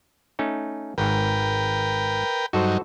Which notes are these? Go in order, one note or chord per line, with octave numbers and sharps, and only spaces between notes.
A3 C#4 D#4
G#1 G#2 A#4 B4 G5
G2 F#3 D#4 F#4 A4 C5